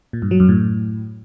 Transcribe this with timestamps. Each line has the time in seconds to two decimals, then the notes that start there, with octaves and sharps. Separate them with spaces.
0.13 A#2
0.22 G2
0.31 F#3
0.40 F#2
0.49 A2